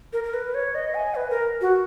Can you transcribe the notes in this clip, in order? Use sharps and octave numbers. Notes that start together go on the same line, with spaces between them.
A#4
A#4
B4
C#5
D#5
G#5
B4
A#4
F#4